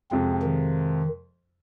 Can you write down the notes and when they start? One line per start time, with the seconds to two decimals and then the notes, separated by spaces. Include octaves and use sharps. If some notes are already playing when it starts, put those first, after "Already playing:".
0.11 F2 C3 F3 G#3 C4
0.42 D#3